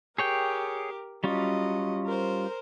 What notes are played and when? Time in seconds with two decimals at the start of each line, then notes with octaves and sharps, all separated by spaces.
0.18 G4 G#4 A#4 C#5 G5
1.24 F#3 G3 C#4 F4 D#5
2.06 A#4 C5